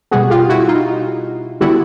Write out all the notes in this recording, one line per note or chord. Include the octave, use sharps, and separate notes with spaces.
B2 G3 B3 F#4 G#4
F4 G4
E4 F#4
D#4 F4
D3 G3 B3 E4 F#4